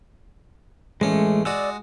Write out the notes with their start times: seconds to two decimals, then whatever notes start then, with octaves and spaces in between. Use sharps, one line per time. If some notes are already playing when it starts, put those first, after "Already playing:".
1.01 A1 G#3 A3 C#4
1.45 G#3 F#4 D5 D#6 E6